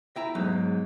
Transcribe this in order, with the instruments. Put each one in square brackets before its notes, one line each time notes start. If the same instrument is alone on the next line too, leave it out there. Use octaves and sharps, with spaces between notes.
[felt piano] E4 [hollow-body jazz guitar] G5 A#5
[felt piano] E2 G#2 [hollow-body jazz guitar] F#3 D#4